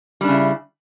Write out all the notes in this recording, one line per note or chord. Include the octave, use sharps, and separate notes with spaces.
C#3 G3 D4 E4